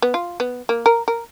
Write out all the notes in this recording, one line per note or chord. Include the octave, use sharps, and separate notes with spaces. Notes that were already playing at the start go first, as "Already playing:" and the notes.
B3
F4
B3
A#3
A#4
A#4